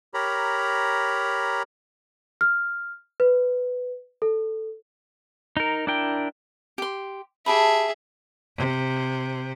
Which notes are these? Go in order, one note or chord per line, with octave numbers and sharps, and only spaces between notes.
G4 A#4 C#5 A#5 B5
F6
B4
A4
D#4 A#4
D4 E4 A#4 G5
G4 C6
G4 G#4 E5 A5 B5
C3